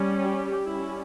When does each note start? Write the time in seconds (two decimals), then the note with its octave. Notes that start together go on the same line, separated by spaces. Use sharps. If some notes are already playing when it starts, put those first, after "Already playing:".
Already playing: G3 C#4
0.23 G4
0.66 G3 C#4 E4